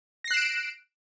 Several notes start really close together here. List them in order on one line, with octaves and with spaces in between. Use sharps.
A#6 C7 F#6 E7 D7